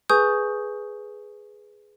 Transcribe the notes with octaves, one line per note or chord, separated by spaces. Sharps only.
G#4 B4 G#5 C#6 D#6 G6